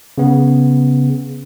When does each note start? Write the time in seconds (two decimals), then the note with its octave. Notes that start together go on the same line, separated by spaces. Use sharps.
0.18 C#3 B3